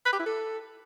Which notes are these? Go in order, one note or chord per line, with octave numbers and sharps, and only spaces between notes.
B4
G4
E4
A4